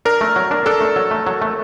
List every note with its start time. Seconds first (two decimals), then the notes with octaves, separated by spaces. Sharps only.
0.05 D4 A#4
0.21 A3
0.36 F#3
0.51 D4
0.66 D4 A4
0.81 A3
0.96 F#3
1.11 A3
1.27 F#3
1.42 A3